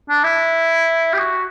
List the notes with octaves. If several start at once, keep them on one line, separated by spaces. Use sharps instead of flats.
D4
E4
G4
F#4